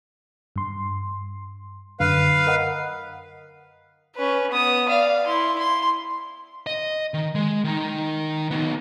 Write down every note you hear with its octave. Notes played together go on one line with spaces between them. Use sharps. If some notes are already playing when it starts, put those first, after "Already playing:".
G2 C6
F#2 D3 B4 F5
A#4 D#5 F#5
C#4 B4
B3 D#6
D5 F5
E4 C6
C6
D#5
D#3
G#3
D#3 D#4
B3 D#4